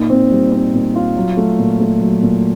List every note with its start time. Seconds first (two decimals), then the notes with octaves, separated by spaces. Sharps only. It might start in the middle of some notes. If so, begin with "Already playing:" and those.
Already playing: A#2 D#4
0.10 C4
0.31 G3
0.52 C4
0.74 A#2
0.96 F4
1.17 F#3
1.37 A3
1.59 A#2
1.80 A3
2.00 F#3
2.22 A#2